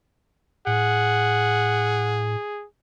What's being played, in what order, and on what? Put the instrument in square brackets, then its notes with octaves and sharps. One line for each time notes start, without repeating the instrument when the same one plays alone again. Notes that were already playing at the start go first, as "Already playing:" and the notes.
[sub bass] A2 [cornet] G#4 [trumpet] F#5